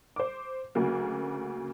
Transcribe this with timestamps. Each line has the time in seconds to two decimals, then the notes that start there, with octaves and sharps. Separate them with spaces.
0.16 C5 D6
0.75 D2 C#3 F#3 A#3